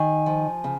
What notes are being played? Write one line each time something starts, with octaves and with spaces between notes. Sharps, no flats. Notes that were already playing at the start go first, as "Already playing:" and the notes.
Already playing: D#3 G#5
F3
C#3